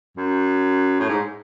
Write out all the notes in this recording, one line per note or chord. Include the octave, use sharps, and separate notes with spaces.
F#2
A2
G#2